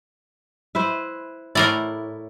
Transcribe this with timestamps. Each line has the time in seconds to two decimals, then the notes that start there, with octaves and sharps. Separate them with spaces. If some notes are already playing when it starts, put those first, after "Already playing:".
0.75 E4 B4 C5
1.55 A2 E4 A#4 D5